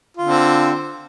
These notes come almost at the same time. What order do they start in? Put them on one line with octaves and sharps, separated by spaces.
F4 D3 C4